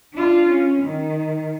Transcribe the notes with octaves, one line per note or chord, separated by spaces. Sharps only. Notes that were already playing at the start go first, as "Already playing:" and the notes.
D4 F4
C#4
D#3